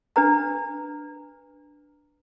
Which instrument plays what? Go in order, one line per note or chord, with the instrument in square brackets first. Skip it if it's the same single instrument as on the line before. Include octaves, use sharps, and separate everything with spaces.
[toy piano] D4 B4 A#5